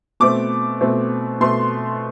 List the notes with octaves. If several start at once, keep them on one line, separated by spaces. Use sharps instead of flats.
B2 A3 C4 D6
B2 A3 C4
B2 A3 C4 C6